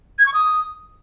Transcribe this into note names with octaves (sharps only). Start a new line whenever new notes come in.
G#6
C#6
D#6